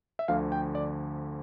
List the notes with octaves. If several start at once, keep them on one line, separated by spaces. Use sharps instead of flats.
E5
D2 D3 F3 F5
G5
D5